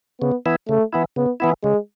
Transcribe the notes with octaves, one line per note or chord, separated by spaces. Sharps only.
C#3 B3
E3 B3 E4
C#3 A3
E3 B3 E4
C#3 B3
E3 B3 E4
C#3 G#3